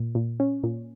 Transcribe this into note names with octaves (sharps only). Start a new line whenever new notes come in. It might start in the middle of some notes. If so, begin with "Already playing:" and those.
Already playing: A#2
A#2
C#4
A#2